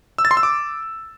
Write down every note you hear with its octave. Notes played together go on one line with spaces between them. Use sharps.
E6
A6
C6
E6
D6